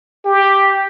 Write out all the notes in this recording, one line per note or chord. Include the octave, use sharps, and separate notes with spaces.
G4